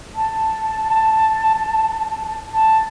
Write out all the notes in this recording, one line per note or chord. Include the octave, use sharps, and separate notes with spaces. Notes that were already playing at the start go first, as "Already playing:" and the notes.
A5
A5